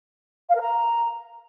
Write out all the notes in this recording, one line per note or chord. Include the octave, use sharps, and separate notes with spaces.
F5
A#4
A#5